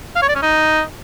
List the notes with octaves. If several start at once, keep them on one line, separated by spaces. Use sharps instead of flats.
F5
C#5
D5
C#4
D#4